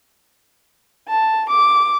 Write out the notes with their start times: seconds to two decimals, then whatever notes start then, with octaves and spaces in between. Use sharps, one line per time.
1.08 A5
1.49 D6